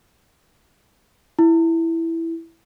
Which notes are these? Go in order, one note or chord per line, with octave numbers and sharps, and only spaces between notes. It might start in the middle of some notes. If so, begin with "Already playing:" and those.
E4